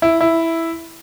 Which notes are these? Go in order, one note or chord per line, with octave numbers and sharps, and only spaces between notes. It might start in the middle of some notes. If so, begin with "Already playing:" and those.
E4
E4